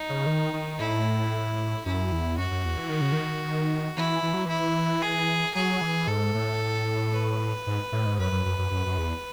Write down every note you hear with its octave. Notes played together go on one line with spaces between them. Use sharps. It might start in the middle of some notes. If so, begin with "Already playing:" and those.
Already playing: D#4
C#3
D#3
D#3
A2 E4
F#2 E4
E2
F#2 F#4
F#2
E2
E3
D#3
C#3
D#3
E3 E4
E3
F#3
E3 E4
G#4
F#3 G#4
E3
G#2 A4
A2
B4
G#2
A2
G#2
F#2 B4
F#2
F#2
F#2
F#2
F#2
E2